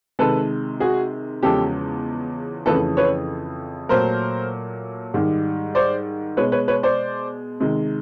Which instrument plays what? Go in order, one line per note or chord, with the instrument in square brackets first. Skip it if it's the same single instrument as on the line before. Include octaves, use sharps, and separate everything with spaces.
[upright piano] C3 D#3 G#3 A4 B4
F#4 G#4
E2 C#3 F3 G#3 G4 A4
F2 C#3 E3 A3 A4 B4
B4 C#5
A#2 F#3 A3 A#4 C5
G#2 D#3 G3
C5 D5
B2 G#3 B4 C#5
B4 C#5
B4 C#5
C5 D5
C3 D#3 G#3